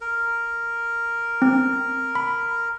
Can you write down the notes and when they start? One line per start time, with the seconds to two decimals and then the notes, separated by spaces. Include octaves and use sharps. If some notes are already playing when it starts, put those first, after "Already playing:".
0.01 A#4
1.42 C4
2.15 B5